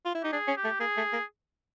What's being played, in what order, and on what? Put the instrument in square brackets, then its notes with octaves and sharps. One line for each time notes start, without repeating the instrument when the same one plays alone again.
[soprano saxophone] F4
E4
[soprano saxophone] D#4 [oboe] G4
[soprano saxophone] D4 [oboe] G#4
[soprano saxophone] C#4
[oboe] G4
[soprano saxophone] A3
[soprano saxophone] A#3 [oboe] G#4
[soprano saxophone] A3
A#3